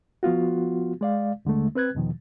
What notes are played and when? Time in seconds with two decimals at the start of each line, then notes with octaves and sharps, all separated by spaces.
0.23 F3 B3 F4 F#4
1.01 G#3 D5 F5
1.45 D#2 D3 G#3 A3
1.75 C4 B4 F#6 G#6
1.95 E2 B2 D#3 F3